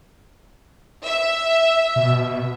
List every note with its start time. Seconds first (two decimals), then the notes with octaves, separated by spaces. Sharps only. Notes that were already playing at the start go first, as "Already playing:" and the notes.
1.05 E5
1.96 B2